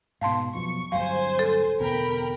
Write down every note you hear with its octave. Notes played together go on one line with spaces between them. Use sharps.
G#2 B2 F5 A5 C6
F#2 B2 F3 C#6
D1 G2 F#3 C5 F5 G#5
A4
D1 E2 B2 A#4 G5 B5